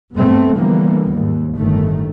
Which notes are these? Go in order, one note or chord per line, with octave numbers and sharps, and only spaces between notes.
G2 A3 B3 C4
D3 E3 F3 G3 A#3 B3
D#2 G#2
G1 A2 D#3 A3